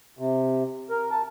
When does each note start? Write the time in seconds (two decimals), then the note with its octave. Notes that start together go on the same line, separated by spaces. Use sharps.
0.19 C3
0.90 A#4
1.11 A5